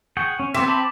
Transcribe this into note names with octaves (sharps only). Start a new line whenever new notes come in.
G#4 F#5 G5 C#6
C#4
B3 C4 A#4 E5 D6
A5 B5 D6